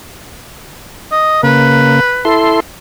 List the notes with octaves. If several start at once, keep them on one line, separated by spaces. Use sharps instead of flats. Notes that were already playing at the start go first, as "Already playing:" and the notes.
D#5
C#3 A#3 B4
E4 A4 C6